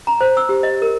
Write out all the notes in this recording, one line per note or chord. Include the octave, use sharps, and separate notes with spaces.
A#5
C5
E6
G4
D#5
A#4